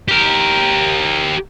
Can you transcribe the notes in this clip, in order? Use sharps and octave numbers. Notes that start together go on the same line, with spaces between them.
G4 A#4